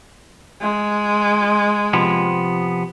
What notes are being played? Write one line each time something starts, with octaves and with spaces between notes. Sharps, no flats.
G#3
C3 F3 B3